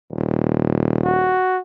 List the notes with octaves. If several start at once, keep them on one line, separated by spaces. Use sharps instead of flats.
D#1
F#4